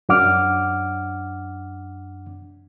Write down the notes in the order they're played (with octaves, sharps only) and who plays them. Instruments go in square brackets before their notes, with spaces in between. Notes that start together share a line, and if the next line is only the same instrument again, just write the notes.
[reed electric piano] F#2 D4 F#5 D6 F6